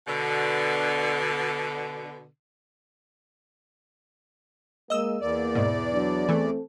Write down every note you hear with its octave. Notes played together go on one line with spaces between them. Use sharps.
B2 D3
G#3 A#3 D#5 E6
E2 A#3 D5
G#2 B2
F#3 D4
E3 A3 C4 A4